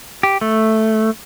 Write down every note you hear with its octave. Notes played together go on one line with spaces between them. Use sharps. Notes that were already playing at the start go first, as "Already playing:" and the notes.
G4
A3